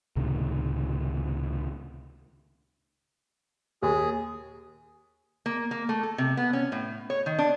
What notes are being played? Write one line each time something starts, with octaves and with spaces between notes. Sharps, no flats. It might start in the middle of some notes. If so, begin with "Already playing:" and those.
C#2 A2 C3 D#3
D#2 G#4
A#3
A#3
A3
A4
C3
B3
C#4
A2
C#5
D#3
D4